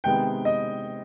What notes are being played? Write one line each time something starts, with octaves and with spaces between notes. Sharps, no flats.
C3 D#3 G#3 B3 G5
D#5